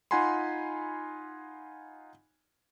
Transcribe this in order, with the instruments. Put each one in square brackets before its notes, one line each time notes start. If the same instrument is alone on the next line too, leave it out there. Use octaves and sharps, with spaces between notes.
[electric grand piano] D#4 F4 F#5 G#5 B5 C6